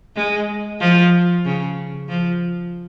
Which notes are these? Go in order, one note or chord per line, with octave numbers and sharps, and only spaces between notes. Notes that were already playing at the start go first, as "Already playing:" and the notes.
G#3
F3
C#3
F3